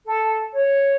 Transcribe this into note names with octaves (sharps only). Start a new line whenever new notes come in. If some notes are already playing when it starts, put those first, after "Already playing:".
A4
C#5